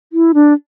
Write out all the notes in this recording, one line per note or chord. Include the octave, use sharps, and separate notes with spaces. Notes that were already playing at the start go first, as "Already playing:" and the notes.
E4
D4